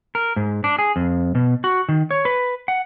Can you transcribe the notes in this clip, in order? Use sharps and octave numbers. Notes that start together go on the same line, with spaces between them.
A#4
G#2
D4
G#4
F2
B2
F#4
D#3
C#5
B4
F#5